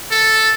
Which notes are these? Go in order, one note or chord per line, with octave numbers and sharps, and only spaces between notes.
A4